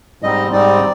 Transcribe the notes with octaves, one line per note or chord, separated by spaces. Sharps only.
G#2 G3 C4 D#4 D#5
G#2 G3 C4 D#4 D5